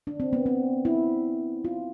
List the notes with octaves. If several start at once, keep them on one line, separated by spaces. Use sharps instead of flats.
D4
C4
B3
C4
E4
F4